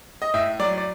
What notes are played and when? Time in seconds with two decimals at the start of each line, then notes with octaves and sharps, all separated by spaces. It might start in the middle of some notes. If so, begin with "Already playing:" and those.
0.22 D#5
0.34 A2 E5
0.59 F#3 D5
0.78 D5